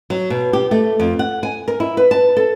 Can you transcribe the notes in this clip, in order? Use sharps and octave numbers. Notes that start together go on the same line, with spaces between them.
F#3
B2
G4
A3
F2
F#5
G#5
A#4
E4
B4
A5
A4